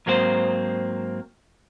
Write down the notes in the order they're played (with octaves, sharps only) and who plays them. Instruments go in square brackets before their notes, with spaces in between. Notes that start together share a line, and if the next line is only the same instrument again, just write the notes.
[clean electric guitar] G#2 F#3 A#3 C4 F#4 C5